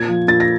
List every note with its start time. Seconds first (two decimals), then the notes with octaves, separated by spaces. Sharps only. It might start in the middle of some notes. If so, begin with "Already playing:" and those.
Already playing: A#2 G#6
0.08 F3
0.28 A#2 A6
0.40 A#6